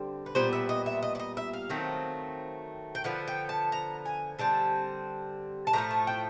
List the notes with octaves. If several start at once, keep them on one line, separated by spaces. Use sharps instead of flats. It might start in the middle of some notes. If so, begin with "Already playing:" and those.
Already playing: D3 G3 C4
B4
A#2 G3 B3 C5
E5
D#5
E5
D#5
D5
D#5
E5
F5
D#3 F#3 A3 C4
G5
D3 F3 B3 F#5
G5
A5
A#5
G#5
D3 G3 C4 A5
A5
A2 F3 A3 A#5
A5
G5